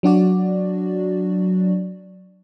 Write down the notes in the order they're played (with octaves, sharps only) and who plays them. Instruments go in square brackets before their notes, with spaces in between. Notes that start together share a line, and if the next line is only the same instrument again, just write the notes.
[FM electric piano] F#3 D4 F#4 D5